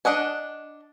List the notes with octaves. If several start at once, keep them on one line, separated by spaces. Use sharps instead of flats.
D4 D#5 F#5 G#5